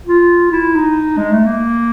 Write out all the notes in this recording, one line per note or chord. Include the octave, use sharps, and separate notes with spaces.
F4
E4
D#4
G#3
A3
A#3